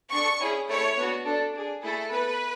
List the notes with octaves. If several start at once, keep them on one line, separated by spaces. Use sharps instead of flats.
D4 A4 C#6
C#4 E4 G#4
A3 E4 A4 C#5
B3 D4 F#4
D4 A4
D4 G#4
A3 E4 G#4 A4
B3 E4 A4 B4